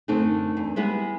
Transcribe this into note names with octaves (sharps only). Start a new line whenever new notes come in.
F#2 D3 A3 C4 D4 D#4
E2
G3 G#3 B3 E4